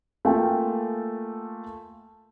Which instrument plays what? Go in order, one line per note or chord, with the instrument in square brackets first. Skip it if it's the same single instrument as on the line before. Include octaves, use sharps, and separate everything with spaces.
[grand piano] A3 A#3 F4 A4 G5 G#5